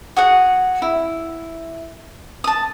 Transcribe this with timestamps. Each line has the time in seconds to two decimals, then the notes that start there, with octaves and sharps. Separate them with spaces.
0.16 F#4 G#4 F#5
0.82 E4
2.44 A5 D#6